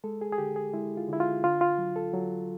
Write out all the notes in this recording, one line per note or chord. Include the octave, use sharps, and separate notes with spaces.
G#3 A4
G#4
G#4
D3 G4
G#4
G#3 E4
F4
D3 E4
F4
D3 F4
F4
F#3
A4
F#3